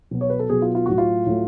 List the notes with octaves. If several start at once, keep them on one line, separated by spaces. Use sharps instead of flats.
B2 F#3 B3
C#5
B4
A4
B2 F#3 B3 G#4
F4
F4
A2 F#3 A3 F#4
F4
A2 F#3 A3